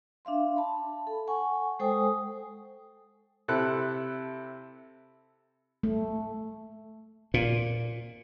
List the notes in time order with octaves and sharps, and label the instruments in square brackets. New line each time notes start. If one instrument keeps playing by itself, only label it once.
[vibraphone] D4 E5 F5 C6
A5 B5
A4
F#5 G#5 C#6
G#3 A4 C5 G5 G#5 D#6
[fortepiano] C3 E4 A4 F#6
[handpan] A3
[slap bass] A#2